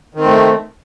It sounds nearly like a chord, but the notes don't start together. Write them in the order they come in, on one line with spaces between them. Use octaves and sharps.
D#3 C4 A3